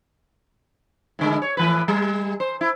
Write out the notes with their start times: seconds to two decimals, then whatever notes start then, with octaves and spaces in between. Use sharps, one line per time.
1.19 A2 D3 G#3
1.42 C#5
1.57 A2 E3 B4
1.88 G3
2.40 C5
2.61 E4